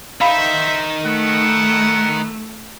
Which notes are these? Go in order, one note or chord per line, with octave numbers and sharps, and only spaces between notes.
D#3 D#4 C5 E5 F5 B5
A3 B3 F#5